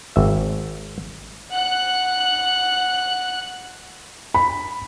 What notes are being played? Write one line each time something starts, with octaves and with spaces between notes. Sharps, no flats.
G#1 E5
F#5 F#6
B5